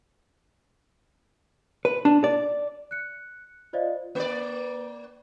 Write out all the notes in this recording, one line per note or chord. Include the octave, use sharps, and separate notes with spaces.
B4
D4
D5
F#6 C#7
F4 C5 D5 D#5 F5
A#3 D5